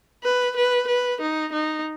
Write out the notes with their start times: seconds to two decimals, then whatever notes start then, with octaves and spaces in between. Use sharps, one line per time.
0.24 B4
0.57 B4
0.88 B4
1.21 D#4
1.53 D#4